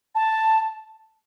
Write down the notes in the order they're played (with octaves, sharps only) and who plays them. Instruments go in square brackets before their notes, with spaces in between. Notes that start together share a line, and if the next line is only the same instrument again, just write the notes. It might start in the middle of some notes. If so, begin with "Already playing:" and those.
[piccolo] A5